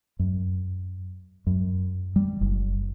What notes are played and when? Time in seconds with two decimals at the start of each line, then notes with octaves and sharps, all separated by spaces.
0.19 F#2
1.47 F#2
2.16 G3
2.41 F#1